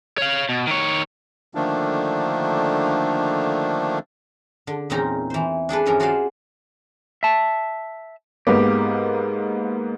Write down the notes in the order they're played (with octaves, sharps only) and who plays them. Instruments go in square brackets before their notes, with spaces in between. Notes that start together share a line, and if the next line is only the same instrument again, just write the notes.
[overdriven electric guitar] C#5 F5
B2
D#3 C#5
[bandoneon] D3 D#3 F3 A3 A#3 D4
[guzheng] D3
E2 A#2 C4 C#4 D#4 A#5
E3 C5
D4 G#4 A4 B4
G2 E3 F3 C#4 A4 A#4
F4 F#4 G#4 C5 D5 F5
[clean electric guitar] E5 A5
[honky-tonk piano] G#2 A#3 B3 [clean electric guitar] G4